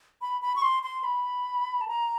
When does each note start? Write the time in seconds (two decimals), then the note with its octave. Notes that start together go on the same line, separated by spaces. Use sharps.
0.22 B5
0.42 B5
0.56 C#6
0.62 C6
0.83 C6
1.04 B5
1.81 A5
1.88 A#5